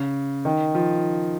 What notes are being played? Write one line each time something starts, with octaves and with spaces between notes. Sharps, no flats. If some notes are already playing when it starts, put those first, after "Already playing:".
Already playing: C#3
D#3
F3